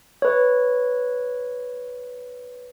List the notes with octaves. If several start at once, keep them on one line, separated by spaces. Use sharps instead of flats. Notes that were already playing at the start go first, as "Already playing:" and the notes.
B4 C#5